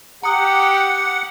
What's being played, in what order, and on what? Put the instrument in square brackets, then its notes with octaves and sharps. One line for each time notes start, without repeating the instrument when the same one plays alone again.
[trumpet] G4 [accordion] F#5 [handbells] A#5 D#6